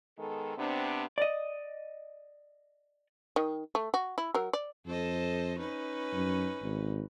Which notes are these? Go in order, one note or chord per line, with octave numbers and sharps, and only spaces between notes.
D#3 G#3 B3 A4
C3 B3 C4 D4
D5 D#5
D#3 D#5
A3
F#4
E4
F#3 A#4
D5
F2 A4 C5 D#5
C#4 D#4 B4
F#2
G#1